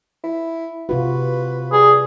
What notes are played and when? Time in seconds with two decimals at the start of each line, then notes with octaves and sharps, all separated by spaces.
0.23 E4
0.89 C3 F4 F#4 B4
1.72 G3 G#4